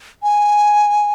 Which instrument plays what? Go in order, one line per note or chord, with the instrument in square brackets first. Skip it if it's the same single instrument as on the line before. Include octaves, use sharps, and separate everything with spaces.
[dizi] G#5